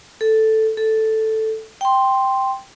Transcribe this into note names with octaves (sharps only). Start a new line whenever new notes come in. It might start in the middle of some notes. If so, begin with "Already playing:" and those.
A4
A4
G5 C6